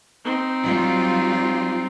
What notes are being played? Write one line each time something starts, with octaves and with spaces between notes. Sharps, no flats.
C4 D#4
F#3 G3 F4